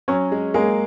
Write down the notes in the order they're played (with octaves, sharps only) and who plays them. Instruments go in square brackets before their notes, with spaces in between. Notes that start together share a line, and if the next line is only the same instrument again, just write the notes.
[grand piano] F#3 [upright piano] C#4
[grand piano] G#3
[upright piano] G#3 [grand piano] A#3